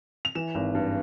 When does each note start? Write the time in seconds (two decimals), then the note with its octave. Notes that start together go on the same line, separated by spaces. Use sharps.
0.25 F7
0.35 E3 E7
0.55 G#1
0.75 G2